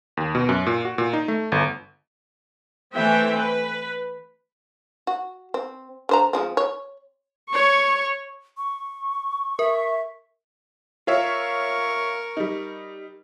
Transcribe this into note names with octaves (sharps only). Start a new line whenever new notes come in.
D#2
B2
F#2
A#2
F#4
A#2
D#4
A3
G1
E3 A3 C4 E5 G5
B4
F#4
C4
D3 C5 A#5
F3 G#3 C4
C#5
C#5 C#6
C#6
A#4 E5
F4 A#4 C#5 E5 C#6
G3 D#4